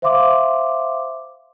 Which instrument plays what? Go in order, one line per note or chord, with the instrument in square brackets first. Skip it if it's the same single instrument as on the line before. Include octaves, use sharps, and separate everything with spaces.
[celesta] C5 E5 F5 C6 D6